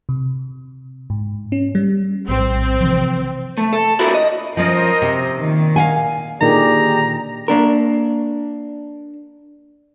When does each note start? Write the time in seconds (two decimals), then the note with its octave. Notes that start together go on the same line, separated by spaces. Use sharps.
0.09 C3
1.10 G#2
1.52 C#4
1.75 G3
2.28 A#1 A2 G3 C4
2.80 C3 E3 F3
3.58 A3
3.73 A4
3.99 E4 F#4 A4 A#4
4.14 D#5
4.57 F3 C#4 A#4 C5 D#5
5.02 C3
5.38 A#2 D#3
5.76 F5 F#5 G#5
6.41 A#2 D3 D#3 G4 G#4 D5 A#5
7.48 A#3 D4 A#4